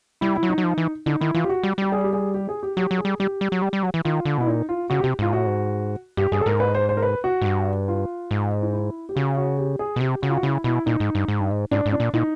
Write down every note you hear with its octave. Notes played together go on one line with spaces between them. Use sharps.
G3 E4
E4
F#3
D#4
F#3
F3
E3
D3 D#4
D#3 E4
E3 F4
G4
F#4
G3
G3 G4
G#4
G4
G#4
G4
G#4
G4
F#3 G4
F#3
G#4
G3
G3 G4
G3
F#3
G3
G3
F#3
E3
D#3 F4
D3
B2 E4
A#2 D#4
F4
C#3 F#4
G4
C3
G#2 F4
A2 F#4
G#2
G2 G4
G2 G#4
A4
G#2 A#4
B4
C5
C5
A#4
B4
F#4
G#2
G2
F4
G#2
D#4
E4
G4
C#3 F#4
F#4
G4
G#4
B2
C3 G4
C#3 F#4
F4
F#4
C#3 E4
B2 E4
A#2 D#4
G#2
G2
G#2
G2
G#2
G#2 D4
G#2
D4
A#2
A#2 D#4